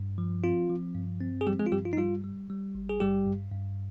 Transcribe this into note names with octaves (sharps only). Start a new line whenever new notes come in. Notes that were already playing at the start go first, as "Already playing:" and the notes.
Already playing: G2
F3
C4 F4
F3
G2
C4
G#4
F3 G3 G4
G#3 G#4
F4
G2 G3 G4
F4
D#4
G3 F4
G3
G3
G#1
G#4
G2 G3 G4
G2
G2